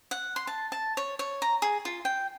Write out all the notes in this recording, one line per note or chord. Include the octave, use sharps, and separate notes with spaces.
F#5
C6
A5
A5
C#5
C#5
A#5
G#4
F4
G5